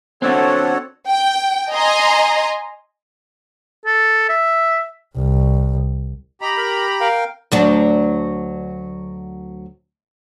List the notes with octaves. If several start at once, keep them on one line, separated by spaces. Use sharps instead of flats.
C4 D4 F#4 A4 C#5 F#5
G5
D#5 G#5 A#5 C6
A4
E5
C2
G4 D#5 A#5 B5
A#4
A#4 F5 G5
D2 F#3 D4